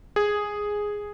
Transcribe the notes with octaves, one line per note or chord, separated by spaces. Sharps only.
G#4